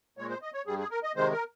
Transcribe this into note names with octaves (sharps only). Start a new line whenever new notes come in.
A#2 G#3 C#5
C5
D#5
C#5
G2 G3 G#4
G#4
A#4
D#5
C3 D#3 G#3 C5
A#4